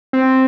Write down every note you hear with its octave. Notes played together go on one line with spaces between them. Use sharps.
C4